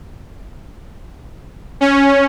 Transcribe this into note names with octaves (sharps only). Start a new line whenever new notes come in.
C#4